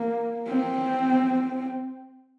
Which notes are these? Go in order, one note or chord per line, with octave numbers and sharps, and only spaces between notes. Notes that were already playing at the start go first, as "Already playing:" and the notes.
Already playing: A#3
C4